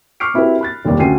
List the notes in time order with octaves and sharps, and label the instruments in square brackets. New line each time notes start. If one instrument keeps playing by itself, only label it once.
[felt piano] C#6 D6 F6 G6 C7 D7
C4 E4 F#4 G4 A#4 B4
B5 F#6 A6
F1 D#2 G3 A#4 D5
D2 C#4 F#4 G5 C7 D#7